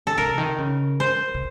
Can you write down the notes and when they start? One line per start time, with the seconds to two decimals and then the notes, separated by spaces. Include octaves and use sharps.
0.07 A4
0.18 C3 A#4
0.38 D#3
0.58 C#3
1.00 C5
1.34 C3